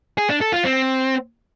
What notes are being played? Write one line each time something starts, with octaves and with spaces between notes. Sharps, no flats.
G#4
D4
A4
F4
C4